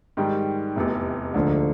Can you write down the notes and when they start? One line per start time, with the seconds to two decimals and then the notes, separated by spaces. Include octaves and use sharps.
0.17 G#2 D#3 G3
0.76 F1 E2 C3
1.34 D2 G#2 D3 F3 A#3